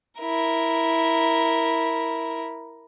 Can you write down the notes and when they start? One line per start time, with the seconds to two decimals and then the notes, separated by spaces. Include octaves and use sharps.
0.21 E4 A#4